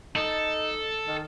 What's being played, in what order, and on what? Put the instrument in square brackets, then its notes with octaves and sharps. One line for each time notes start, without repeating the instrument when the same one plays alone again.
[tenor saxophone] D#4 [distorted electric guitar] A4
[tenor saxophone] D#3